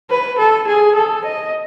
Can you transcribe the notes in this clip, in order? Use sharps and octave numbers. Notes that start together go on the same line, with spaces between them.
B4
A4
G#4
A4
D#5